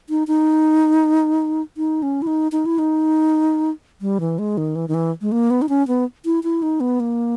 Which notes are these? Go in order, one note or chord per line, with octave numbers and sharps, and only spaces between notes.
D#4
D#4
D#4
C#4
E4
D#4
D#4
E4
D#4
G3
E3
G#3
D#3
E3
D#3
E3
G#3
A#3
B3
D#4
C#4
B3
E4
E4
D#4
B3
A#3